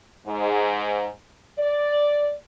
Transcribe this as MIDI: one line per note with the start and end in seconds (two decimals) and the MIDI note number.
0.27 1.08 44
1.58 2.33 74